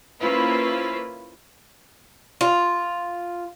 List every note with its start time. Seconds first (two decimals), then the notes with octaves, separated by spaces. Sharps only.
0.19 A#3 C#4 E4 F4 B4 C5
2.41 F4